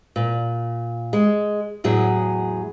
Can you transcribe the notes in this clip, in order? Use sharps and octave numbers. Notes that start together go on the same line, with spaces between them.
A#2
G#3
E2 A2 F#3 G#4